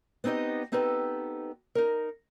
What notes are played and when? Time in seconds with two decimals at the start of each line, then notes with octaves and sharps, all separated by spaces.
0.24 B3 C4 D#4 G4 D#5
0.72 B3 C4 D#4 G4 A4 B4
1.75 D#4 A#4